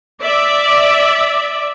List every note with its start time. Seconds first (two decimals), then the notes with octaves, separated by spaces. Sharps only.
0.22 D5 E5